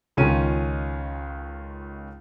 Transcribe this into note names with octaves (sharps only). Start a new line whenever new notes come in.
C#2 D#3 C#4 F4 D#7